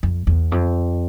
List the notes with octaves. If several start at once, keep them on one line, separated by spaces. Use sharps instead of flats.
F2
E2
F2